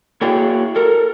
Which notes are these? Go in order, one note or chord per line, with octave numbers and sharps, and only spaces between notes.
A#3 E4 F#4 G#4 C#5 G5
A4 A#4